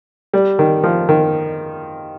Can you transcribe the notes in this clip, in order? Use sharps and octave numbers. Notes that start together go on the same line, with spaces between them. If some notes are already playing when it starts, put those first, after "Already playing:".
G3
D#3
F3
D#3